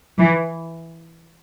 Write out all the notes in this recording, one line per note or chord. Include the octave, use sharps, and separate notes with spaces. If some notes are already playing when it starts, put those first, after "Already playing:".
E3